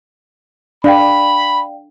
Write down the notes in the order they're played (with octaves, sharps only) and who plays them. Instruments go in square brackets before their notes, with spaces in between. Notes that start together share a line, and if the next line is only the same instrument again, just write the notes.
[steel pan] D4 [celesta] D5 F5 G5 [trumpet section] B5